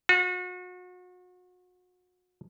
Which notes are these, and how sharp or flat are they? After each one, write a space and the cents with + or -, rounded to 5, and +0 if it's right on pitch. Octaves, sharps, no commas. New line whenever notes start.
F#4 -35